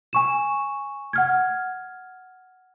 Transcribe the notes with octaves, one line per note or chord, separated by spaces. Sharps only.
G#5 C#6 E7
F#5 F6 G#6